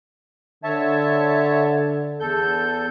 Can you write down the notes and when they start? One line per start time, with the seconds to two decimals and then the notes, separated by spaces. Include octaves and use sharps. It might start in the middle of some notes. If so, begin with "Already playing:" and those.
0.64 D3 C#5 E5 A5
2.20 E2 A4 G6